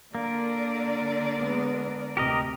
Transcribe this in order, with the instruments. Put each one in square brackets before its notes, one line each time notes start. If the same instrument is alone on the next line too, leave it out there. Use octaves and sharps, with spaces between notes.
[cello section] D3 A#4 D5 [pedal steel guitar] A#3
[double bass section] G#3 B3
[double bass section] D2 C3 [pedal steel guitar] G4 A#4 D#5